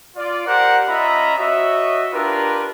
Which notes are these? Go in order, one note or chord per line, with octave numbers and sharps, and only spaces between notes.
F4 D5
G4 A#4 C5 D5 F#5
C#4 F4 D#5 E5 A#5 B5
F#4 C#5 D#5 E5
D4 F4 G4 A#4 B4